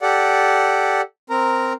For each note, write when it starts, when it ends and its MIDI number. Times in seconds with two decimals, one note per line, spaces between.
0.01 1.01 67
0.01 1.01 69
0.01 1.01 74
0.01 1.01 78
1.30 1.73 60
1.30 1.73 70
1.30 1.73 82